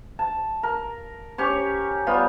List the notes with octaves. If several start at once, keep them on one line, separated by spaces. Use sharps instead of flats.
A5
A#4
C#4 G4 C#5
G3 B3 F4